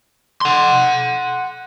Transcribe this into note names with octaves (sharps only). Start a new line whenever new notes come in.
F#5 C6